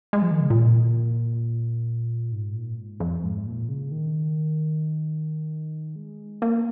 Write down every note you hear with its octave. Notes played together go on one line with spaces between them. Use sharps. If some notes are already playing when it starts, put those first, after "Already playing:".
G#3
F3
D#3
C#3
A#2
G#2
A#2
G#2
F2
G#2
A#2
C#3
D#3
G#3
A#3